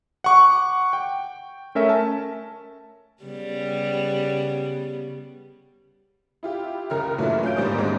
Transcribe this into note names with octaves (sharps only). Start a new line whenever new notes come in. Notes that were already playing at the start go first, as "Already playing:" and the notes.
F#5 C#6 D6
G5
A3 C#4 A#4 E5
A5
C#3 G3 B3
E4 F4 G4
F#1 C#2 A#4 A#5 F6
G2 A#2 E3 F#3 A3 A#3
C#4 F5 G6 D7
D2 G#2 G3 A#3 C5 D#6
D#2 G#2 D3 G3 G#3 C4